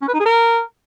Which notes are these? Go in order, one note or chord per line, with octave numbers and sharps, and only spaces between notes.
C#4
B4
D#4
G#4
A#4